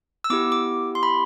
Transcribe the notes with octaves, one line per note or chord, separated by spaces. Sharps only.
E6
B3 E4 G4 D6
D6
C6
B5